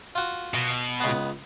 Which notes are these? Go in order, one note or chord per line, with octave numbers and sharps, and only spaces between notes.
F4 F#4
B2
C#2 B3